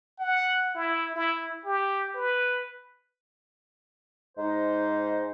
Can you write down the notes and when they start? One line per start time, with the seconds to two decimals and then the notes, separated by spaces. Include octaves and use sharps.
0.19 F#5
0.75 E4
1.16 E4
1.65 G4
2.15 B4
4.38 G#2 D#4 C5